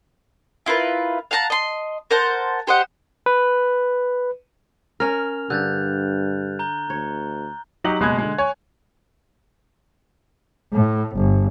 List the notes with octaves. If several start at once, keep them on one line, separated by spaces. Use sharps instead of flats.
E4 F4 A#4 B4
F5 F#5 A5 A#5
D#5 C6
A#4 C5 F#5 A5
G4 C5 D#5 F#5
B4
C#4 A#4 F6 F7
G2 D3 F#6 G6 A6
A#5 G6 G7
D2 C#5
F#3 D#4 G4 F#7
F#1 B2 G#3 B5 F#6 G#6
D3 G#3
C#5 G#5
A2
G1